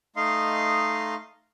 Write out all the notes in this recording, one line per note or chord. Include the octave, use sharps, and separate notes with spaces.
A3 D#4 D#5 F5 C6